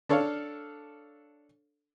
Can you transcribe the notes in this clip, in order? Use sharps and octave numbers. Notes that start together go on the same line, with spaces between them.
D4 A4 C#5 F5